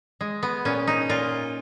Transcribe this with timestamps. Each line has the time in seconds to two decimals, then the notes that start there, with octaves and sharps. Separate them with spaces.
0.21 G#3
0.43 B3
0.65 A#2 C#4
0.87 D#4
1.09 A#2 F4